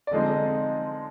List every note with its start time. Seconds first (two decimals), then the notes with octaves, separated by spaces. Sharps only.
0.07 D5
0.11 D3 F3 G#3 C4 D#4 D#5